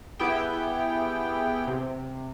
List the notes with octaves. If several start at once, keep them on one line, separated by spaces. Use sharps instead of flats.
B3 E4 G4 G#4 G5
C3